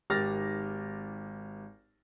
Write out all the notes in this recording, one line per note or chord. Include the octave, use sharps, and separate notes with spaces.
G#1 G4 F6 A6 A#6